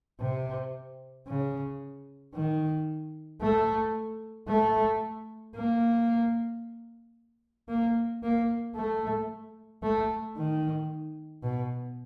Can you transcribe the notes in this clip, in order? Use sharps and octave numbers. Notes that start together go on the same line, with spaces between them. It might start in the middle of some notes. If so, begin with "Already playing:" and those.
C3
C#3
D#3
A3
A3
A#3
A#3
A#3
A3
A3
D#3
B2